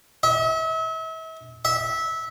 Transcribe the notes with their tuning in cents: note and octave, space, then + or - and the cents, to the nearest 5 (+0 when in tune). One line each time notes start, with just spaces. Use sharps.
E5 -40
E5 -20